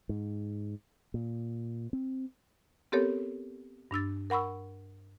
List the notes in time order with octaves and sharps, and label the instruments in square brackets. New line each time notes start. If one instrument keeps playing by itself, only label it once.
[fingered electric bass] G#2
A#2
C4
[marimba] B3 C4 G4 A4 A#4 C#5
G2 D4 E6 A6
A#4 F#5 B5 C#6 E6